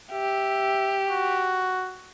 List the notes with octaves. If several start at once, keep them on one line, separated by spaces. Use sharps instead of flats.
G4 E5
F#4